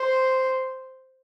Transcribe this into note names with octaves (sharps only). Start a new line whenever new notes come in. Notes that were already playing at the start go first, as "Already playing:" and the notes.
Already playing: C5